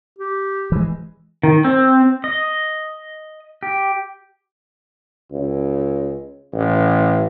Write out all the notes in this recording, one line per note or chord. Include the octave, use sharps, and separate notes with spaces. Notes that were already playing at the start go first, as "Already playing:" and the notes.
G4
E3 G#3
D#3
C4
D#5
G4
C#2
A1